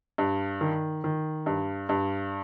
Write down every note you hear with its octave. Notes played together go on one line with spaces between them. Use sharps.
G2
D#3
D#3
G2
G2